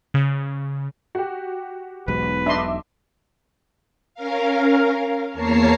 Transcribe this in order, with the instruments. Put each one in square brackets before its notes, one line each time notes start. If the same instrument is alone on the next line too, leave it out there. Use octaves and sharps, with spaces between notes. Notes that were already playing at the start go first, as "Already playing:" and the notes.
[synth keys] C#3
[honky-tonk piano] F#4 G4
[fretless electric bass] E1 B1 G#2 [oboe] B4
[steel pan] D4 D#5 C6 [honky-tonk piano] E5 D6
[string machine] C#4 A#4 F5
E2 A#3 C#5 A5 A#5 C7